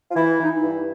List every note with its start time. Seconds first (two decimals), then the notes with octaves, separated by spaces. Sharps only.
0.09 F4
0.14 E3 E4
0.38 E3 D#4
0.50 E4
0.62 G2